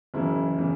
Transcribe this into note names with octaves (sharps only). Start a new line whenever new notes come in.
F#1 F#2 C#3 E3 E4
C#3 E3